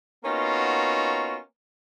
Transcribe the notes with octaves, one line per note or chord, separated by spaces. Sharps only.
A#3 B3 C#4 D#4 F4 F#4